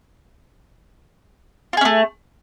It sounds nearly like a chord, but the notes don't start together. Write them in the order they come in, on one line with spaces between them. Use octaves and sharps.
F4 G#4 C#4 A3